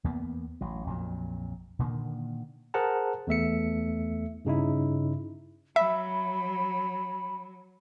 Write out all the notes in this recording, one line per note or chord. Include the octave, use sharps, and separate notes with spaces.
E2 A#3 B3
A1 F#3
A#1 F2 A#2 F#3
A#2 D3 D#3 A#3
G#4 A#4 C5 F#5 A5 A#5
E2 A3 E5 C#7
G2 C#3 D#4 E4
F#3 E5 B5